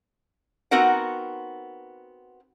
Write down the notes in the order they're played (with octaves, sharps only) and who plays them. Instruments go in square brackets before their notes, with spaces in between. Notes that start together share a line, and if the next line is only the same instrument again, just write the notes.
[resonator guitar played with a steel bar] B3 C4 D#4 F#4 A#4 F#5